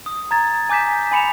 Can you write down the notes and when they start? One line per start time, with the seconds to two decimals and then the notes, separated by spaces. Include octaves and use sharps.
0.06 D#6
0.31 A#5 G#6 A6
0.69 G#5 D6 G6 B6 E7
1.12 G#5 B5 C#7 E7 F7